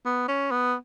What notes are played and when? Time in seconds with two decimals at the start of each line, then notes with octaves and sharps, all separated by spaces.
0.05 B3
0.28 C#4
0.51 B3